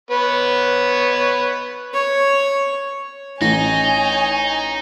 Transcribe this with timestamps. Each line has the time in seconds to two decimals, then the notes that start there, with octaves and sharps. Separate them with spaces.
0.11 B3 B4 C#5
1.94 C#5
3.42 A1 D#4 C#5 G#5 A#6